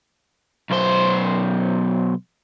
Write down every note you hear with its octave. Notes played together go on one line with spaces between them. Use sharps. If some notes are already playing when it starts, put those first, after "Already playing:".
B1 C5